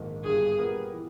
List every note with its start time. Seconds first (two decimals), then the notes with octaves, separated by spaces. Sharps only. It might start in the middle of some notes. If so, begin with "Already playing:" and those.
Already playing: A#1 G#2 D#3 A#3
0.24 G1 G2 G3 G#4
0.58 A#2 G3 B3 G4 A#4
0.93 E3